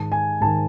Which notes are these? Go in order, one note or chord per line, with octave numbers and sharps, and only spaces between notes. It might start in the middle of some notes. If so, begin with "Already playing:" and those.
Already playing: G#2 D#3 A5
G#5
G#2 D#3 A5